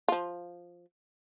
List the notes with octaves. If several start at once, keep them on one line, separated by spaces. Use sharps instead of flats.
F3 F4